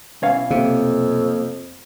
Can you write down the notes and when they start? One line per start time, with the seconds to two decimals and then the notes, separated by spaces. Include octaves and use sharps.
0.22 B1 E3 C#4 C#5 F5
0.51 F2 C3 A#3